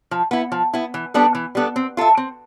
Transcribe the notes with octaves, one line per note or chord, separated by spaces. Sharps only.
F3
B3 E4
F3
B3 E4
E3
G3 B3 D4 A4
E3
G3 B3 D4 A4
C4
F4 A4 E5
C4